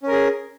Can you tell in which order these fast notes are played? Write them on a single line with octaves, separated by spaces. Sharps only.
C#4 A#4 G#4